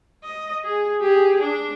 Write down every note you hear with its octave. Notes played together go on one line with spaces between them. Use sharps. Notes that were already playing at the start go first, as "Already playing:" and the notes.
D#5
G#4
G4 G#4
D4